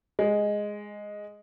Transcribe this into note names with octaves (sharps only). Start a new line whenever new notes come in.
G#3